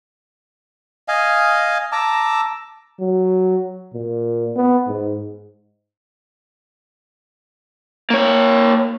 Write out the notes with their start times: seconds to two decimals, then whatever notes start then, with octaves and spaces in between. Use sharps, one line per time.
1.08 D#5 F5 G#5
1.92 A5 A#5 D6 E6
3.00 F#3
3.94 A#2
4.56 B3
4.88 G#2
8.10 A#3 C#5